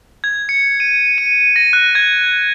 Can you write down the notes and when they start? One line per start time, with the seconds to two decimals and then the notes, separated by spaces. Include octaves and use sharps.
0.24 G#6
0.49 C#7
0.80 D#7
1.18 D#7
1.56 A#6
1.73 F#6
1.95 G#6